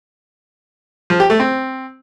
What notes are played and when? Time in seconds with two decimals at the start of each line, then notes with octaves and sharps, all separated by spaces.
1.10 F3
1.20 G4
1.30 A3
1.40 C4